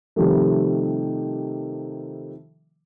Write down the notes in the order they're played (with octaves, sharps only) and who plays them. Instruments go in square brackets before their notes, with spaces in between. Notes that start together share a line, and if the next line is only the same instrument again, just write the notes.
[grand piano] C3 D#3 F3 G3 A3